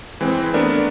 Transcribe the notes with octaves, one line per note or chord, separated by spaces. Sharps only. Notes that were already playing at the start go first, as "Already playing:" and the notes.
E3 G#3 C4
A3 B3 D4 A#4